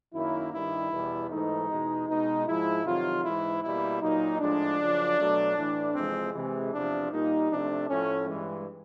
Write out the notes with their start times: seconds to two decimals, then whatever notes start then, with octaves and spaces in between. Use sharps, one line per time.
0.13 F#2 D#3 F#3 A#3 E4
0.52 G2 D#3 G3 E4
0.91 E2 B2 G3
1.30 G#2 E3 A3 D#4
1.68 E2 B2 G#3
2.07 B2 G#3 D#4
2.46 G#2 F3 G#3 E4
2.85 F2 C3 D#3 F#3 F4
3.23 G#2 E3 G#3 E4
3.62 B2 G3 A#3 E4
4.01 A#2 F#3 A#3 D#4
4.39 A2 F3 G#3 D4
4.78 F#2 C#3 F3
5.18 B2 F#3 A3
5.56 A2 E3 A3
5.95 F2 C3 E3 G#3 C4
6.34 C3 E3 G#3
6.72 E2 C3 F3 D4
7.11 A#2 G3 A#3 D#4
7.50 C3 F3 A3 D4
7.88 A2 F3 A3 C#4
8.27 G2 E3 G#3